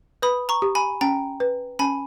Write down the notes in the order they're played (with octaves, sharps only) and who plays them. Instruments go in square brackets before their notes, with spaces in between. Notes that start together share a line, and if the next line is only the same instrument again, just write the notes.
[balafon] B4 [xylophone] B5 D#6
[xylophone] A#5 C#6
[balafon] G4
[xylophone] G#5 B5
[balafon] C#4 [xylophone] G5 A#5
[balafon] B4
[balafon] C#4 [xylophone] G#5 B5